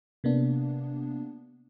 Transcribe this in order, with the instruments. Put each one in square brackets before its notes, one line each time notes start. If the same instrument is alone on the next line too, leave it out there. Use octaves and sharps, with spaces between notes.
[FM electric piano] C3 A#3 B3 D4